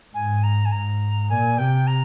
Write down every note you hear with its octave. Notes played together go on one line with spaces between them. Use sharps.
G#2 G#5
A#5
G#5
G#2 A#5
A#2 G#5
C3 G5
A#5